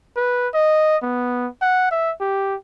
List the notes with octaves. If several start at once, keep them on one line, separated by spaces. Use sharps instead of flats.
B4
D#5
B3
F#5
E5
G4